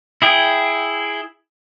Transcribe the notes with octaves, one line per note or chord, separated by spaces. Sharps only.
E4 G#4 G5